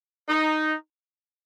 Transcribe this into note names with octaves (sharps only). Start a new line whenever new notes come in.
D#4